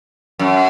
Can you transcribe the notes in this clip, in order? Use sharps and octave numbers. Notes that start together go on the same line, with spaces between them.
F#2